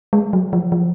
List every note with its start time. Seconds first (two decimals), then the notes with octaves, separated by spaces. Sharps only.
0.13 G#3
0.33 F#3
0.53 F3
0.72 F3